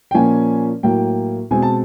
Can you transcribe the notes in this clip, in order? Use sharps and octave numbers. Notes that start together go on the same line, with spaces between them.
G5
A#2 F3 A#3 C#4 G#5
A2 F#3 A#3 G5
B2 G#3 C4 G#5
A5